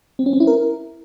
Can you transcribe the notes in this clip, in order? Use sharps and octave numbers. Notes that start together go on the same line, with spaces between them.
C4
C#4
C4
E4
A#4